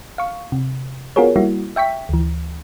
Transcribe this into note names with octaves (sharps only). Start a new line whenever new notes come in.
F5 C#6
C3
B3 F4 F#4 G#4 A#4 C#5
G3 A#3 E4 F#4
E5 G5 C#6 B6
D2 E3